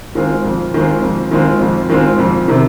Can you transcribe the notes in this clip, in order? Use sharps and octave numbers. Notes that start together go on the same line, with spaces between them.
D#3 G#3 C4 F4
F2
D#3 G#3 C4 F4
F2
D#3 G#3 C4 F4
F2
D#3 G#3 C4 F4
F2
C3 D#3